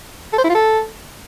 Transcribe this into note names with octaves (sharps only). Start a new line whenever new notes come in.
A4
C5
E4
F4
A4